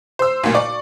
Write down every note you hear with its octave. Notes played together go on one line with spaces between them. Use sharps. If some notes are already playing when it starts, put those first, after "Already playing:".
C5 E6
B1 A#2
D5 C#6